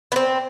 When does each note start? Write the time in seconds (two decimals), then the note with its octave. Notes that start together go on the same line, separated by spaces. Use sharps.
0.12 B3
0.16 C4